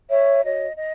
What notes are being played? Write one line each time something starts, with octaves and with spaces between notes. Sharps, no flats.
C#5 E5
F#4 C#5 D#5
D#5